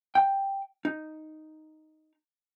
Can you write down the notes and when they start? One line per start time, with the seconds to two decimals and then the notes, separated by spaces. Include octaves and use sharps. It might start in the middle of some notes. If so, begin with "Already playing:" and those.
0.15 G5
0.85 D#4